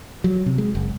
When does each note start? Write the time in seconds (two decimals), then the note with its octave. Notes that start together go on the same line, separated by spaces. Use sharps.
0.24 F#3
0.46 C3
0.58 G#3
0.75 F#1